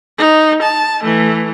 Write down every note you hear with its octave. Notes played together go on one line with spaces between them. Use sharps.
D#4
A5
E3 A3